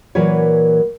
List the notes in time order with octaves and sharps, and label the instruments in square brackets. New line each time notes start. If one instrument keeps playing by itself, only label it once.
[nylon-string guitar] A#2 E3 F#3 A#4 B4 C#5